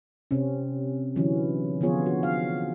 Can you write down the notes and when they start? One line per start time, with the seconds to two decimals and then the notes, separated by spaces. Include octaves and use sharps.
0.31 C3 C4 C#4
1.16 D3 E3 F#3 C#4
1.81 D3 F3 B3 F4 G#4 C#5
2.06 F#4
2.23 F5